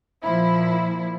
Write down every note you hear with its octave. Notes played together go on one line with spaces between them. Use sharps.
A#2 F3 E4